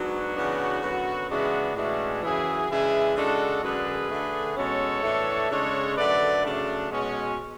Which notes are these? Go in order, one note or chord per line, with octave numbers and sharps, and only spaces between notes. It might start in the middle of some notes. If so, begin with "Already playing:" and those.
Already playing: G#2 F#3 B3 D4 F#4
C#3 E3 B3 D4
F#2 D3 F#3 B3
C#3 E3 G#3 B3 D4 F#4
A2 E3 G#3 C#4 D4 F#4
F#2 C#3 E3 E4 G#4
C#3 E3 G#3 D4 E4 G#4
C#3 G#3 D4 F#4 A4
F#2 D3 G#3 D4 G#4 B4
D3 A3 D4
B2 G#3 C#4 A4 C#5
A2 E3 A3 D4
C#3 G#3 D4 A4 C#5
F#2 D3 A3 B4 D5
C#3 F#3 A3 D4
B2 G#3 C#4